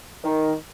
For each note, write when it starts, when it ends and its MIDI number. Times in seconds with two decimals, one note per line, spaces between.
0.24 0.53 51